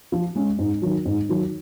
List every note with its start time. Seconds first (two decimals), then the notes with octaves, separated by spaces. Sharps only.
0.12 F3
0.36 G#3 C#4
0.59 G#2
0.82 D#3 F#3
1.05 G#2
1.29 D#3 F#3